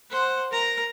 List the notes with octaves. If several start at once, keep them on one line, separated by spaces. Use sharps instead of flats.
C5 F#5
A#4 A#5